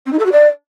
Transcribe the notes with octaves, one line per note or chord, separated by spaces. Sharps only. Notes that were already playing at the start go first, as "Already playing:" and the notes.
C4
D#4
A4
F#4
D5